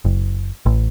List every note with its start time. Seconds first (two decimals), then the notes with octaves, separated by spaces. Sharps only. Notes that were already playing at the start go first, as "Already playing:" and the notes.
0.05 F#1
0.66 A1